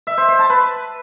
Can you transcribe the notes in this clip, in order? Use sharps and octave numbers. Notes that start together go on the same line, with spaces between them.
E5
C5
C5
A5
B4